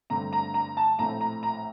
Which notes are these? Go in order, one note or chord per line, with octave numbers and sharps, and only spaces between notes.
G2 D3 A3 C4 A#5
A#5
A#5
A5
A#1 A2 A3 C4 A#5
A#5
A#5